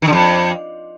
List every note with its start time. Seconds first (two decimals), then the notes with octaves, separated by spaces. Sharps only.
0.02 D#3
0.07 D3
0.12 F2